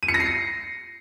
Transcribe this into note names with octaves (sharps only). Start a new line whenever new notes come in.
D#7
C#7
A#6
C7